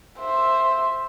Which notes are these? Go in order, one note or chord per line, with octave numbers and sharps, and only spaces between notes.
C5 E5